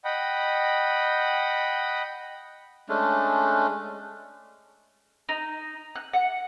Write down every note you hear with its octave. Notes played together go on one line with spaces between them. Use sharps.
D#5 F#5 G5 B5
G#3 A3 C#4 D4
D#4
F#6
F#5